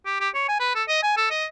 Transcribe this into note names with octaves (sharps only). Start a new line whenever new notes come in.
G4
G4
C#5
G#5
B4
A4
D#5
G#5
A4
D#5